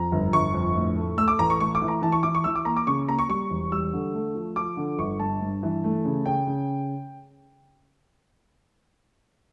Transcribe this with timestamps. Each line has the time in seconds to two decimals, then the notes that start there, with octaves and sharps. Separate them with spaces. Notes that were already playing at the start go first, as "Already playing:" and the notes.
Already playing: F2 A#5
0.12 G1
0.33 G1 C#6
0.54 F2
0.76 A2
0.96 A3
1.17 A3 E6
1.28 D6
1.39 A1 A#5
1.50 C#6
1.60 A3 C#6
1.75 D6
1.82 E3
1.88 A#5
2.02 E3 A5
2.12 C#6
2.23 E3 D6
2.35 C#6
2.44 E3 E6
2.55 D6
2.65 A#3 A#5
2.76 D6
2.87 C#3 C#6
3.08 A#3 A#5
3.19 C#6
3.29 G3 C#6
3.50 E1
3.72 G3 E6
3.93 D3
4.14 A3
4.35 F3
4.56 F3 D6
4.77 D3
4.99 G1 C#6
5.19 G2 A5
5.41 G2
5.63 E3
5.84 A3
6.05 C#3
6.26 C#3 G5
6.47 C#3